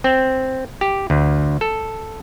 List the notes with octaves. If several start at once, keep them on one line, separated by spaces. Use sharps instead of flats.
C4
G4
D2
A4